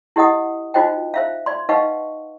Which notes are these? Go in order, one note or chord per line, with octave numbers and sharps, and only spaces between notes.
E4 G4 D#5 F#5 D#6
D#4 F4 F#4 C5 D#5 G5
C5 E5 F5
D5 C6
D#4 B4 D#5 F5 F#5 C#6